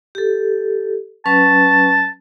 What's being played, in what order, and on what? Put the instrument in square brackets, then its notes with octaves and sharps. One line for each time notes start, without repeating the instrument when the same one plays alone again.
[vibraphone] G4 A4
[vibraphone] F#3 C#4 B4 [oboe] A5